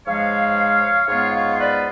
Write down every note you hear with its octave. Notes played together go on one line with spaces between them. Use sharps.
G#2 F3 G#3 C#5 F5
G#2 G#3 B3 F4 C#5 F5
C#5 F5
C#5
B4 D5